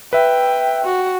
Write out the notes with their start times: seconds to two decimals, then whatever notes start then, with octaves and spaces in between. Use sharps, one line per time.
0.13 B4 E5 G5
0.85 F#4